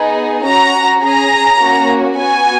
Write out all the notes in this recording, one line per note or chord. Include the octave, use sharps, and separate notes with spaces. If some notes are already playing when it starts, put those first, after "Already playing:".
Already playing: B3 D#4 G#4
C#4 F#4 A#5
C#4 G#4 A#5
A#3 C#4 F#4
B3 F#4 G#5